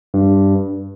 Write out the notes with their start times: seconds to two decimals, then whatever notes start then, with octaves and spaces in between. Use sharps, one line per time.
0.14 G2